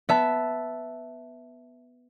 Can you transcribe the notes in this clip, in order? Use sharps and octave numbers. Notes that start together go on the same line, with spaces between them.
B3 E5 A5